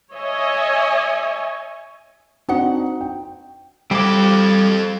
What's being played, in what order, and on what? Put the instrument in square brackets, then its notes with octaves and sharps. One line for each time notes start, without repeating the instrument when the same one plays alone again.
[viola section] C#5 D#5 E5 G#5
[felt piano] C4 D4 [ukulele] D#4 F#4 F#5
[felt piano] G5
[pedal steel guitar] G3 D6 [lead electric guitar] C4 A4